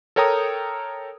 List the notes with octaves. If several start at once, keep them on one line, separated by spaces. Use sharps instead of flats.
A4 A#4 C#5 G5 A#5 D#6